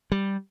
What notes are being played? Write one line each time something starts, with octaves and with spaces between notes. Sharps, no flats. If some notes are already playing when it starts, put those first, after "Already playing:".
G3